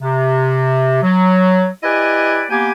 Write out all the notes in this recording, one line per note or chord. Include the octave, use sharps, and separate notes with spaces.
C3
F#3
E4 G4 B4 D5 D#5 G#5
A#3 B3 G4 G5 G#5